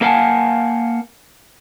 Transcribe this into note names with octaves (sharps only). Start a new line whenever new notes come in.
A#3 A#4 F5 F#5 G#5 A5